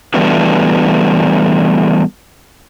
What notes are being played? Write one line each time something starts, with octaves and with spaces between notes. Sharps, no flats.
E3 G3 A3 B3 D4 F#4